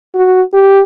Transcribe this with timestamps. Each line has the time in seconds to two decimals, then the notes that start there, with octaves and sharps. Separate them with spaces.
0.15 F#4
0.53 G4